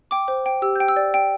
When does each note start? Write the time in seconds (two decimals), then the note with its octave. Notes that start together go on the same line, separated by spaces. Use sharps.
0.11 G5 D6
0.28 C5
0.46 G5
0.62 G4 E6
0.76 G5 G6
0.88 E6
0.96 D5
1.14 G5